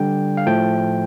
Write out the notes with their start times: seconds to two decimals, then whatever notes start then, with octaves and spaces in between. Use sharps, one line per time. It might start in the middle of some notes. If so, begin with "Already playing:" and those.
Already playing: D3 G3 G5
0.37 F5
0.47 A2 F3 A3 G5